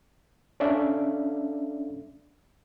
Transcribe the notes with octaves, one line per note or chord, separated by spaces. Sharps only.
C#4 D4 A4 D5 E5 F5